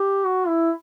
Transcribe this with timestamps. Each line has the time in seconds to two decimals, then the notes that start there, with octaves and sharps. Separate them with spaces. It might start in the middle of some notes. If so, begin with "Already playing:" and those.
Already playing: G4
0.25 F#4
0.47 E4